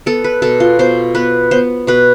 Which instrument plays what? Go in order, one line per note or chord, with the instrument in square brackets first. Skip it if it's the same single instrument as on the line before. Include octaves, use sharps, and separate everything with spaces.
[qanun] B3 A4
B4
B2 A4
F4
B2 C5
B3 B4
B3 C5
B2 B4